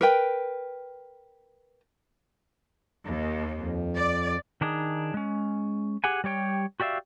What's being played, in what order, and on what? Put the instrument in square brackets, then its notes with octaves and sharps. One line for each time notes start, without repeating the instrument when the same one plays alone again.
[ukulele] A#4 B4 G5
[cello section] D#2
[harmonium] F2
[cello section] D5
[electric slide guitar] D#3 D4 D#4 G#4
G#3 C#4
G4 G#4 F#5 G#5
G3 G4 C#5 G5
F#4 G4 D5 E5 F5